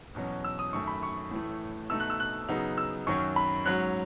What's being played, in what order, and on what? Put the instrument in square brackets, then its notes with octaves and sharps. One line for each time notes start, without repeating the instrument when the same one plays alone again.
[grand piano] E2 B2 F#3 C#4
E6
D#6
F#2 D#3 A3 C#6
B5
C#6
A2 E3 A3
B2 A3 D#4 E6
F#6
E6
F#6
C#3 F#3 B3 D#4
E6
F#2 D#3 F#3 C#4 C#6
B5
G#2 F#3 C#4 F#6